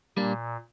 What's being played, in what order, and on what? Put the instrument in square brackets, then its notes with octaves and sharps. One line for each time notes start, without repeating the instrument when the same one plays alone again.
[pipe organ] A#2 [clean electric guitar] G3 A#3 D4